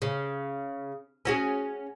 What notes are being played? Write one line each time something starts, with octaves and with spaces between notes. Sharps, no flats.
C#3
C#4 F#4 G#4